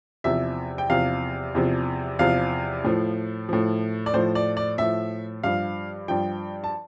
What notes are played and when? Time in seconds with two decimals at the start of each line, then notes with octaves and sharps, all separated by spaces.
0.24 E2 C3 F3 E5
0.78 G5
0.89 E2 C3 F3 F5
1.55 E2 C3 F3
2.19 E2 C3 F3 F5
2.84 A2 F3
3.49 A2 F3
4.06 D5
4.14 A2 F3 C5
4.35 D5
4.57 D5
4.78 A2 F3 E5
5.43 G2 F3 F5
6.08 G2 F3 G5
6.64 A5